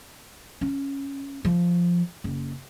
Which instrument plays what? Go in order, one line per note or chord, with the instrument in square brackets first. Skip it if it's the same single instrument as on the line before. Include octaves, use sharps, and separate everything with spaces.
[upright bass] C#4
F3
F#1